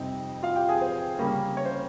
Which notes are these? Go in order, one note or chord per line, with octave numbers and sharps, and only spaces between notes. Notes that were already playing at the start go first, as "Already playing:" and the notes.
Already playing: F2 C3 G3 C4 D#4
F4 F5
G4 G5
G#4 G#5
C5
C#3 G3 A#3 C#4
C#5
C5